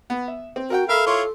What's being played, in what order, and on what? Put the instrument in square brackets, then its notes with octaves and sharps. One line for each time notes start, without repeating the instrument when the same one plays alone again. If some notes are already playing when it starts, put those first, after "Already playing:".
[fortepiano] B3
E5
C4
[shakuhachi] F#4 [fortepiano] A#4 F#5 G5
[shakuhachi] A4 [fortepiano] A#4 [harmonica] E5 F5 B5
[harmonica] E4 F4 C#5 [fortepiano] C6 D6